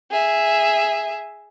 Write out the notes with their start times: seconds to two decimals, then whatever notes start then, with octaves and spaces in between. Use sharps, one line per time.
0.10 G#4 E5